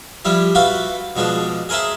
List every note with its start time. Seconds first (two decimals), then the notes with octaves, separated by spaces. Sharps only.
0.25 F3 G3 E4
0.55 F4 F#4 B4 E5 F5
1.16 B2 F3 G#3 D4
1.69 G#4 A#4 C5 E5 A5